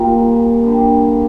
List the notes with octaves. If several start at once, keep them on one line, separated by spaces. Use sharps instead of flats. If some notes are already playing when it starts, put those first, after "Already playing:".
Already playing: A#2 G3 A#3
D3 G3 D4